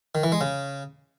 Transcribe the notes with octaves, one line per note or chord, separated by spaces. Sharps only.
D#3
E3
G#3
C#3